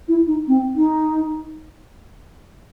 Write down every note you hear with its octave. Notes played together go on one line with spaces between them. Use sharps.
E4
D#4
C4
D#4